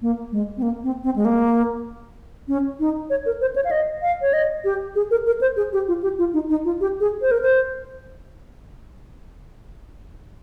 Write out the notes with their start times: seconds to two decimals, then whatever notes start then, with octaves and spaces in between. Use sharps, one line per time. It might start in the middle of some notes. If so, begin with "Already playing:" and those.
0.02 A#3
0.32 G#3
0.57 C4
0.62 A#3
0.84 C4
1.04 C4
1.16 G#3
1.25 A#3
2.48 C#4
2.80 D#4
3.10 C#5
3.26 A#4
3.41 C5
3.56 C#5
3.65 F5
3.71 D#5
4.02 F5
4.22 C#5
4.33 D#5
4.64 G4
4.95 G#4
5.11 A#4
5.27 A#4
5.41 C5
5.57 G#4
5.73 G4
5.88 F4
6.03 G4
6.19 F4
6.34 D#4
6.50 D#4
6.65 F4
6.81 G4
7.00 G#4
7.22 C5
7.31 A#4
7.42 C5